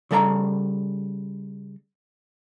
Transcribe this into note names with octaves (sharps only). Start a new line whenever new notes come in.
C#3 G3 A4 D#5 A#5